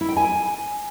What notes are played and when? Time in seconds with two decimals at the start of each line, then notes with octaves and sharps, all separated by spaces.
0.01 E4
0.09 G5
0.17 G#5